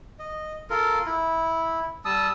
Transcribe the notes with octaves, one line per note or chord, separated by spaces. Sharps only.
D#5
F4 A4 A#4
E4
G3 A5 D#6 E6